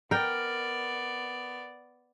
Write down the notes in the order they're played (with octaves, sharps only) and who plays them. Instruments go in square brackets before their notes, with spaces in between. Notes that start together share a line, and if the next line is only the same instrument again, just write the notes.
[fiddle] B3 D5 [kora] A#4 G5